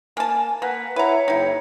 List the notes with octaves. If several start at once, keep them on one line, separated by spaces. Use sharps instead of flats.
A#3 G#5 A5
A#3 B4 F#5
E4 B4 C#5 A#5
F#1 D#4 E4 G5